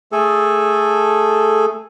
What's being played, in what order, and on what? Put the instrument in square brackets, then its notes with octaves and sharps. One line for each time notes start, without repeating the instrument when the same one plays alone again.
[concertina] A3 G#4 A4